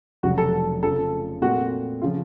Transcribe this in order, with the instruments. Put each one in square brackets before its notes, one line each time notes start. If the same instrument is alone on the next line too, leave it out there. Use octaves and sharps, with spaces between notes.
[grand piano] F1 F2 C#3 F#3 [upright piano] F#4
[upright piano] A4
[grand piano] F2 C#3 F3 A3 C#4 [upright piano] A4
[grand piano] A#2 A3 C4 [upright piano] F#4
[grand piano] C#3 F3 [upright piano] F4